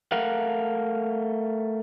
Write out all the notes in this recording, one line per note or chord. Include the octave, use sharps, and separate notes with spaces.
A3 A#4 F5 F#5